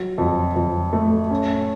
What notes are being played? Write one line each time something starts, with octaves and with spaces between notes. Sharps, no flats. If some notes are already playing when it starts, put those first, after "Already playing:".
Already playing: F#3
F2
F2
A3
C#4